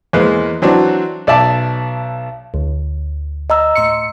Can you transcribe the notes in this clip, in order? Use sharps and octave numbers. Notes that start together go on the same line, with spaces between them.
E2 G#3 A#3 B4 C5
E3 F#3 C4 D4 F#4
B1 D5 E5 A5
D2
D#5 A#5 E6
A2 C6 C#7